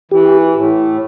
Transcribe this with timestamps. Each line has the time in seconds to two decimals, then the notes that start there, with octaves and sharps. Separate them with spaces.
0.11 E3 G4
0.55 A2